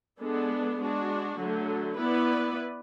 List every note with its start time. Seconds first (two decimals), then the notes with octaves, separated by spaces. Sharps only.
0.20 G#3 B3 D4 A4
0.79 G#3 D4 F#4
1.38 D3 F#3 A3
1.97 B3 E4 B4 D5